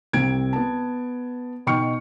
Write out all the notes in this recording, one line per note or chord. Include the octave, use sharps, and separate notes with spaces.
C2 C4 G#6 D7
B3 A5
B2 D#4 G5 C#6 F6 C#7